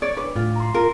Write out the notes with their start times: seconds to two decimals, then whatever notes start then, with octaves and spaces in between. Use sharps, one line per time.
0.02 C#5 D5
0.17 D4 B4 D6
0.36 A2 F4
0.56 A#5 C6
0.74 F4 A#4